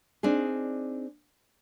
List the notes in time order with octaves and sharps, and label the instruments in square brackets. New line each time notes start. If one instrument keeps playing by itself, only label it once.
[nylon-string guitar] C4 D4 D#4 G#4